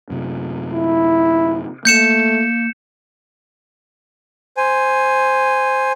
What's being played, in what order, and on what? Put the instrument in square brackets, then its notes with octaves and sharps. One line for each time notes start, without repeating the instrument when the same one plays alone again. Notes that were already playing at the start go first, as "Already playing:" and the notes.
[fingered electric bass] F#2 C3
[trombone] E4
[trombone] A3 [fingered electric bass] A#3 [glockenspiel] G6 C#7 E7
[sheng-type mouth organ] C5 G#5